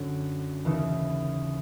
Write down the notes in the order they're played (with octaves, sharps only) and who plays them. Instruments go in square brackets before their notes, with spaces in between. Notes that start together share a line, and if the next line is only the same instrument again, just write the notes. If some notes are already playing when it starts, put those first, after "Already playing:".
Already playing: [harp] F#2 D3
D#2 C#3 E3